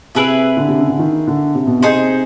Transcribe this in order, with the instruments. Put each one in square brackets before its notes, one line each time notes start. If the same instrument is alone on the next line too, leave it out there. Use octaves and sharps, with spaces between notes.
[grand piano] C3 [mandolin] E4 G#4 B4 E5
[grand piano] D3
C3
C#3
D3
D#3
D3
C3
B2
[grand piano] C3 [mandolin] D#4 G#4 C5